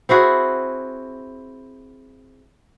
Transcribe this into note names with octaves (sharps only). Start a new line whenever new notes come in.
C4 E4 F#4 G#4